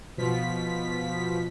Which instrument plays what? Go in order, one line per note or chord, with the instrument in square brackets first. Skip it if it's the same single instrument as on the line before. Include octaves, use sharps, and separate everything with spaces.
[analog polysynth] B2 F3 B6